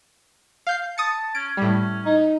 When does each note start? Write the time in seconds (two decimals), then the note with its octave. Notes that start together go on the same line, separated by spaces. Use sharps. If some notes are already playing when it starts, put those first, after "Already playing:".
0.67 F5 G6 C7
0.98 A5 D#6 A6 C#7
1.35 C#4 D7
1.57 A2 G3 C#4
2.06 D#4